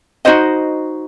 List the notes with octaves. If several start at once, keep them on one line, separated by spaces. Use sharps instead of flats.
D#4 F#4 C5 D#5